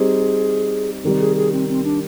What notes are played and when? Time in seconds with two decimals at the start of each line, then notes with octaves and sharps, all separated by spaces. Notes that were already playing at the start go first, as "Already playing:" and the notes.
Already playing: G3 C4 D#4 G4 G#4 C5
1.04 C3 D#3 G3
1.20 G#4
1.36 G#4
1.52 C4
1.69 C4
1.84 D4